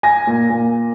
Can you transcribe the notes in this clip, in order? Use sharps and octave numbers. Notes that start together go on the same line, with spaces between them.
G#5 A#6
A#2
A#2